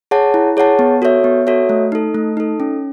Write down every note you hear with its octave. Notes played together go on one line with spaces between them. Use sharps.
G#4 C#5 F#5 A5
E4
G#4 C#5 F#5 A5
B3
F#4 A4 C#5 E5
B3
F#4 A4 C#5 E5
A3
D#4 A4
A3
D#4 A4
C#4